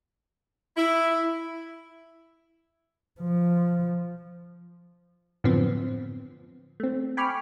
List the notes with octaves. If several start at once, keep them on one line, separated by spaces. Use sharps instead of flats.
E4
F3
F#2 A2 D3 F3 B3 C4
A3 C4
G5 G#5 B5 C#6 D6 F6